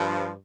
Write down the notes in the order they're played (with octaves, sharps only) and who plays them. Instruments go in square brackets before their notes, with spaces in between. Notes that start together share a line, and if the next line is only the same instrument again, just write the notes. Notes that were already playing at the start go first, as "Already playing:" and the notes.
Already playing: [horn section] G2 F3